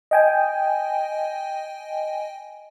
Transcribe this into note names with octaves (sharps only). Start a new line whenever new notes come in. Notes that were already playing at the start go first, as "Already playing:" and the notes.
D#5 G5 G#5